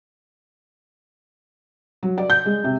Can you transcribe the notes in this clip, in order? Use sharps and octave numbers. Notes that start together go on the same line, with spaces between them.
F#3
D5
G6
G#3
C3